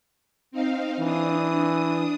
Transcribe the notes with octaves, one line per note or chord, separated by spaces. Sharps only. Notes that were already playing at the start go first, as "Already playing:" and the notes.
C4 D#4 F5
E3 D4 D#6